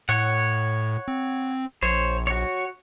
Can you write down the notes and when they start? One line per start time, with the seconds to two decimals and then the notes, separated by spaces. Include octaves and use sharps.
0.09 A2 C#5 F#5
1.08 C4
1.83 A#1 C5 C#5
2.27 F#4 C#5